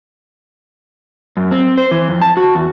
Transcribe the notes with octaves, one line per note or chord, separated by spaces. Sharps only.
F#2
C4
C5
E3
F2
A5
F#4
E2